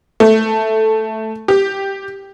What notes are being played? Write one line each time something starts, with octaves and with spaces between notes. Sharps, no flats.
A3
G4